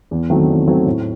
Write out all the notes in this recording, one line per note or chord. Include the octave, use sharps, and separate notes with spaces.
E2
D#3 F#3 A3 C4
E2
D#3 F#3 A3 C4
A2